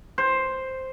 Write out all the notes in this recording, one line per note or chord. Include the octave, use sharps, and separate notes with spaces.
C5